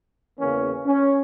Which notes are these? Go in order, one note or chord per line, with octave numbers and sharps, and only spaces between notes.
E2 C#3 E3 A#3 C#4
C#4